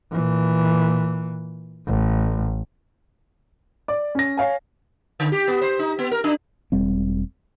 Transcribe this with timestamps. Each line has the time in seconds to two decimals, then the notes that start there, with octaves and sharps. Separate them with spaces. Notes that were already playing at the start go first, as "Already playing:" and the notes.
0.12 A#2 E3
1.87 A1
3.88 D5
4.15 C#4 A#6
4.37 C#5 F5 G#5
5.20 D3
5.32 G4
5.48 B3
5.62 C5
5.79 D#4
5.99 B3
6.12 A#4
6.24 D4
6.72 E1 G3 C4